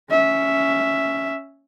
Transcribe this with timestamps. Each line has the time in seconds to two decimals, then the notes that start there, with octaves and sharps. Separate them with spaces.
0.10 C#4 E5